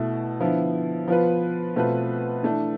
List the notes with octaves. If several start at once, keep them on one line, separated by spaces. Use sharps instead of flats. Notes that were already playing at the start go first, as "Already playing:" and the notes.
Already playing: B2 A3 E4
D3 F3 B3 E4
F3 B3 F4 B4
B2 A3 C4 F4 B4
E3 A3 D4